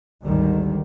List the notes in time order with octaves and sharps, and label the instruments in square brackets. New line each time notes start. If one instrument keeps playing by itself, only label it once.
[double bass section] G#1 D2 G#2 D3 D#3 G3